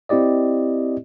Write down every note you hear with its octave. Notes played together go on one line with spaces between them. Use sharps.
C4 E4 G4 D5 D#5